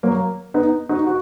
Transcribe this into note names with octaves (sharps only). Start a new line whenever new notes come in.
F#3 A#3
B3 D#4
D#4 F#4
F#4